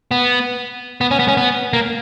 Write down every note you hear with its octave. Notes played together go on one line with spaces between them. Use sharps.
B3
B3
C#4
B3
C#4
B3
A#3